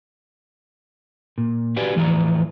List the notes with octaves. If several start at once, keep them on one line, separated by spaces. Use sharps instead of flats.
A#2
F#4 G4 B4 D5 F5 G#5
E2 A2 E3 F3 D5 A#5